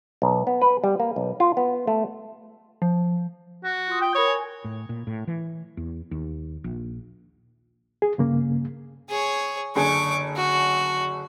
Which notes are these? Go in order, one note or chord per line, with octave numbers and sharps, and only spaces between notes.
B1
B3
B4
G3
A#3
B1
F4
B3
A3
F3
F#4
F4 C6 D#6
G5
A#4 C#5 B5 D#6
G#5
A2
A#2
A2
E3
E2
D#2
A#1
G#4
G2 C#3 A#3
G#4 C#5
F#1 D3 G#4 C#6 D6
F#4